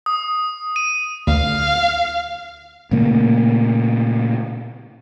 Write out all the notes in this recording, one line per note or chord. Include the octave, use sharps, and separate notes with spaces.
D#6
D#7
D2 F5
A#2 C#3 A3 A#3